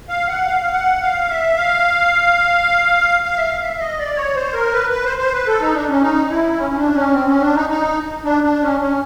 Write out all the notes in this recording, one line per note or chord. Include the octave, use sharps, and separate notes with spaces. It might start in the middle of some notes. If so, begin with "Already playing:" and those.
F5
F#5
F5
F#5
F5
E5
F5
F5
E5
F5
E5
D#5
D5
C#5
C5
A#4
B4
B4
C5
C5
B4
A4
D#4
D4
C#4
D#4
E4
C#4
C#4
D4
C#4
C4
C#4
D4
D#4
D#4
D4
D4
C#4
C#4